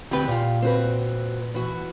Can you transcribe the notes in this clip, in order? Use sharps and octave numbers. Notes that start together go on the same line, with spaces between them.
D2 C4 G4 B4
A#2 F4
C4 F#4 B4
E3 F#4